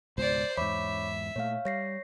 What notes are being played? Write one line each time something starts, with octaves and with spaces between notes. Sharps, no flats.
C#2 G#2 B2 C5 D5
E2 G#2 C#5 E5 B5 D6
A#2 A3 C#5 F5
G3 C#5 A#6 C7